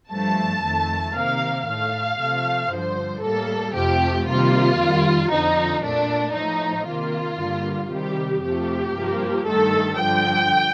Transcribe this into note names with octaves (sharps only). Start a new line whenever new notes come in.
G2 F3 A3 A5
F2 D#3 A3
C3 D#3 A#3 F5
A2 A3 F5
C3 F3 A3
G2 D3 F3 C5
A2 G3 A#3 A4
F2 C3 F3 A3 G4
C3 D#3 G3 A#3 F4
F2 D#3 G3
F2 D3 F3 D#4
A#2 A3 D4
A2 F3 A3 D#4
C3 D#3 A#3 F4
G2 D3 G3 A#3
C3 D#3 G3 G4
F2 C3 F3 A3 G4
G2 F3 A#3
G2 D#3 A3 A4
G2 D3 F3 G5